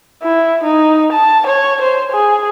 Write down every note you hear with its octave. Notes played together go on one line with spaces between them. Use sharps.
E4
D#4
A5
C#5
C5
G#4